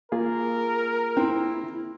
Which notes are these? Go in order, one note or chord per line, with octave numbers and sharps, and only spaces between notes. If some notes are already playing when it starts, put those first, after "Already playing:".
A#3 F4 G#4 A#4
C4 E4